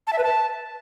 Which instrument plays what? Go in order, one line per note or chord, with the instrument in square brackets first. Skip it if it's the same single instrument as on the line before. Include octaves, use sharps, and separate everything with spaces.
[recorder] A5
E5
B4
A5